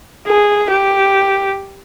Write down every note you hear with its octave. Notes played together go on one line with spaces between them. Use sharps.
G#4
G4